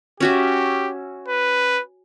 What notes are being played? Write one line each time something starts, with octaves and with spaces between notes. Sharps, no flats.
C#4 F#4 G4 E5
B4